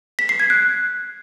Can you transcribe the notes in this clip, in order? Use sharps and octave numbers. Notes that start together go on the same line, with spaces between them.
B6
C7
G#6
F#6